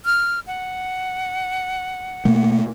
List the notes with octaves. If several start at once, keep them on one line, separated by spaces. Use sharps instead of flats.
F6
F#5
B2 A3 A#3